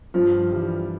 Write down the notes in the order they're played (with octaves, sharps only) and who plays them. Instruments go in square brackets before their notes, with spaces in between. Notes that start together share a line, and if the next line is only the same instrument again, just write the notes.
[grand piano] G2 [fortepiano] F3
[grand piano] E3 G3